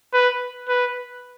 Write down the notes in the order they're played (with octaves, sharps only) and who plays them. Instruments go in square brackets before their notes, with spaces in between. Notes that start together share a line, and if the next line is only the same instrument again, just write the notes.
[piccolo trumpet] B4
B4